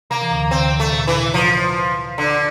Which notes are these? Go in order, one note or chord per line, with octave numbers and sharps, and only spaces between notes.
C3 A#3
E3
D2 D3
D2 D3 C4
C3
A3
A#2
E3
C3
F3
D3